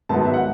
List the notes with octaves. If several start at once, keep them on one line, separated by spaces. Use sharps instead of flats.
G#2 D#3 F#3 B3 A5
E5
F#5